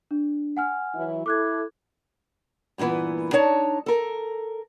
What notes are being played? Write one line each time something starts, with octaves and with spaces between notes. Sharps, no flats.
D4
F#5 G#5 F6
E3 F#3 E4
E4 A4 D6 F#6 G#6
G2 A#2 D3 E3 B3
D4 D#4 C#5 A5
A4 A#4